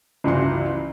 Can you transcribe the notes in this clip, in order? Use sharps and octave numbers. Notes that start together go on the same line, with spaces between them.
G1 C#2 E3 F#4 C6